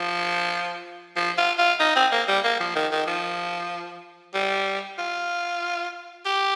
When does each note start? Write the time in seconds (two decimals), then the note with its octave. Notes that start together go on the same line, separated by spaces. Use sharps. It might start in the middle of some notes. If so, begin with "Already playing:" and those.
Already playing: F3
1.16 F3
1.38 F4
1.58 F4
1.80 D#4
1.96 C4
2.12 A#3
2.28 G3
2.44 A#3
2.60 F3
2.76 D#3
2.92 D#3
3.07 F3
4.34 G3
4.98 F4
6.25 G4